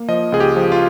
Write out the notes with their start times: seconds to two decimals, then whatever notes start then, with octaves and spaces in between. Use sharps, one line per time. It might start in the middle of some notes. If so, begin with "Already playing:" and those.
Already playing: A#3
0.08 F3 D#5
0.32 C#2 G#4
0.40 G4
0.56 F3
0.72 F4